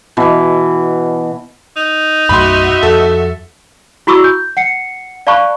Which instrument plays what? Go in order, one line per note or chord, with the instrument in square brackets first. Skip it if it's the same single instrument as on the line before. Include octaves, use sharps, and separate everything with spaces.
[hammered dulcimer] B2 E3
[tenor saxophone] D#4
[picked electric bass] B1 F#2 A3 [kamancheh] F#4 E5 [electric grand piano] B5 C6
[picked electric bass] F2 [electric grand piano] A4
[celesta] E4 F#4 B5 C#6 D6 E6
G6
F#5 C7 C#7
D5 F5 A5 B5 C#6 F#6